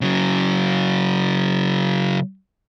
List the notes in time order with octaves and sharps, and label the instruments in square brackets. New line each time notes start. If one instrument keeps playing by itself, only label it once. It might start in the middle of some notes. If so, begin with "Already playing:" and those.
[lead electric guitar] C#3 F#3